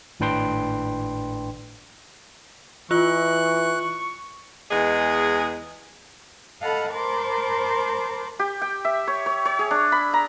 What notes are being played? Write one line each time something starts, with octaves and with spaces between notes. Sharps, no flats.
G#1 A2 D4 B4 G5 C6
E3 F4 C#6 F#6
E2 G#3 G#4 D#5
A4 D#5 F5 F#5 A5 B5
A#4 C5 A5 B5 C6 D6
G4
G5
E5
C#5
C#5
C#5
G#4
D4
B5
A#5